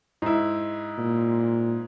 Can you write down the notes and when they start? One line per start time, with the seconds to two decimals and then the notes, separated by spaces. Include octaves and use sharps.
0.22 G#2 E4
0.98 A#2